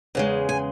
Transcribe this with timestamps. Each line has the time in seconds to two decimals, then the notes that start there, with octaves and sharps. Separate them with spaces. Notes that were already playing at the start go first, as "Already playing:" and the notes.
0.15 E2 C#3 G#3
0.49 G#5